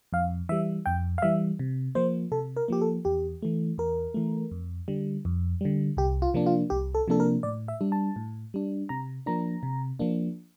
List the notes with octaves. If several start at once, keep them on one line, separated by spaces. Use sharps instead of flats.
F2 F5
E3 G3 E5
F2 G5
F5
E3 G3 E5
C3
F3 A#3 C5
C3 A4
A#4
F3 A#3 G4
A4
E2 G4
E3 A3
E2 A#4
E3 A3
F2
D3 G3
F2
D3 G3
C2 G4
F4
C3 F3 A#3 D4
F4
C2 G4
A4
C3 F3 A#3 D4 A4
A#4
A2 D5
E5
G3 D4
A5
A2
G3 D4
C3 A#5
F3 A#3 D4 A#5
C3
F3 A#3 D4